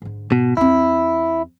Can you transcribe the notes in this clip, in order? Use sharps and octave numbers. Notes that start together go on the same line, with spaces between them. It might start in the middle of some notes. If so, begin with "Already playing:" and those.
G#2 D3
G#2 B2
E2 C4 E4